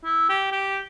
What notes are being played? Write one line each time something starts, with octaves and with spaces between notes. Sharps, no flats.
E4
G4
G4